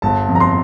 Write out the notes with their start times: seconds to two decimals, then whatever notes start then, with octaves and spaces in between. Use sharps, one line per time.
0.02 G1 A5
0.28 F2
0.35 A#5
0.40 C6